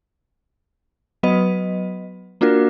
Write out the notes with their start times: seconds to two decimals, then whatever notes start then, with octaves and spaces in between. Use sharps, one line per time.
1.23 F#3 B3 B4 D#5
2.41 A#3 D4 F4 F#4 A#4